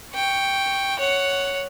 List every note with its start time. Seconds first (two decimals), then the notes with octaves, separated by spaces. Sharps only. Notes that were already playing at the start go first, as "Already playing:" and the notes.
0.15 G5 C#6
0.99 C#5 F#5